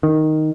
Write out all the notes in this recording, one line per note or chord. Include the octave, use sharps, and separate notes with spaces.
D#3